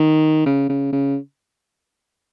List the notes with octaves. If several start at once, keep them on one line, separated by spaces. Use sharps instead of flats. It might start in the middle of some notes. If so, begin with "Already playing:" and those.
Already playing: D#3
C#3
C#3
C#3